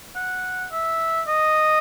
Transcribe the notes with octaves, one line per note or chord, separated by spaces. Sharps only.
F#5
E5
D#5